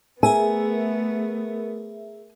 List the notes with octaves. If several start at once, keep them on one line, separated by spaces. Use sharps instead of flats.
A3 B3 G#4 A#4 E5 G#5